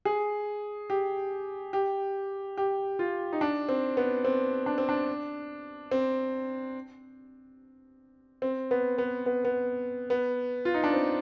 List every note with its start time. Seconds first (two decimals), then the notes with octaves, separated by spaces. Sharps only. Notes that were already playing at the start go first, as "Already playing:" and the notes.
0.05 G#4
0.90 G4
1.73 G4
2.57 G4
2.99 F4
3.33 D#4
3.41 D4
3.69 C4
3.97 B3
4.24 C4
4.66 D4
4.78 C4
4.89 D4
5.91 C4
8.42 C4
8.71 B3
8.98 B3
9.26 B3
9.45 B3
10.10 B3
10.65 F4
10.74 D#4
10.84 D4
10.93 C4